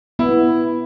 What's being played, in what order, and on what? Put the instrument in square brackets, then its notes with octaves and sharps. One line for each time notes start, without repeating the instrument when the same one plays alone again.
[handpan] B3 [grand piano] E4